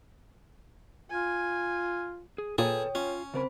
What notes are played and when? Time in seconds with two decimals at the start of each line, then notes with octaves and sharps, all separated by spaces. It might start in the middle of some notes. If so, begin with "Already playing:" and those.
1.10 F4 G#5
2.38 G#4
2.58 A#2 G#4 A4 B4 C#5 G5 D#6
2.95 C#4 F4
3.34 C#3 C4 A#4 C5 B5